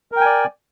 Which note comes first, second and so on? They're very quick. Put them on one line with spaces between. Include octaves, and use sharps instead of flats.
A#4 G5 G#5 D5